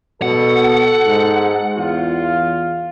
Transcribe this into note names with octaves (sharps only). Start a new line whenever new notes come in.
B2 A4 F#5
G#2
E2 F4